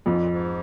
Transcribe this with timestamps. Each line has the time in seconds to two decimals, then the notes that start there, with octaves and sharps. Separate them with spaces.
0.06 F2 G#2
0.17 A#2
0.28 G#2